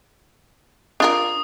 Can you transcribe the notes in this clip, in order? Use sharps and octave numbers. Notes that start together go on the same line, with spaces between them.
D4 F4 A#4 D#6